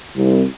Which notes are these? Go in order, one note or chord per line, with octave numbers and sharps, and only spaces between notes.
C2